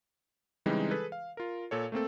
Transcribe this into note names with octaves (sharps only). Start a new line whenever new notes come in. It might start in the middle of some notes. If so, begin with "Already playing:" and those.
C#3 E3 G3 G#3 C4 D#4
G#4 A4 B4
F5
F4 A#4
A#2 A4 C#5
A3 A#3 C4 A4